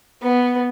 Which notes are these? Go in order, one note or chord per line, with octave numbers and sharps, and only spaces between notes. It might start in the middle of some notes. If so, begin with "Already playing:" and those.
B3